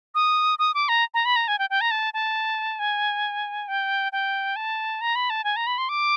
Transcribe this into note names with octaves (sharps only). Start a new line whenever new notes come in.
D#6
D#6
D6
A#5
A#5
B5
A#5
G#5
G5
G5
A#5
A5
A5
G#5
G5
G5
A5
A#5
B5
A5
G#5
A#5
B5
C6
D6